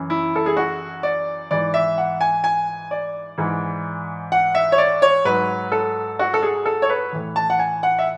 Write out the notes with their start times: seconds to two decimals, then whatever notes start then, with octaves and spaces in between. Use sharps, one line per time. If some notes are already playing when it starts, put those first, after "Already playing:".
Already playing: F#2 E3
0.10 E4
0.36 A4
0.46 G#4
0.57 F#4
1.03 D5
1.51 G#2 E3 D5
1.74 E5
1.98 F#5
2.21 G#5
2.44 G#5
2.91 D5
3.38 G#2 E3
4.32 F#5
4.55 E5
4.72 C#5
4.78 D5
5.02 C#5
5.25 G#2 F#3 B4
5.72 A4
6.19 F#4
6.34 A4
6.42 G#4
6.66 A4
6.82 C#5
6.89 B4
7.12 A2 E3
7.36 A5
7.50 F#5
7.59 G#5
7.83 F#5
7.99 E5